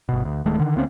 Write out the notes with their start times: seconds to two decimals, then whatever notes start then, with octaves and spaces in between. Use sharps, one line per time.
0.09 G1 B2
0.25 D2
0.45 D1 D#3 G#3 A3
0.60 D3 D#3
0.76 D2 A#3 C4 C#4